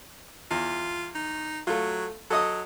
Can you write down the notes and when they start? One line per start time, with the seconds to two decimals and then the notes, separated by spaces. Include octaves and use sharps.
0.51 E2 F4
1.15 D#4
1.67 F#3 A3 F4
2.30 F#3 A4 D#5 D#6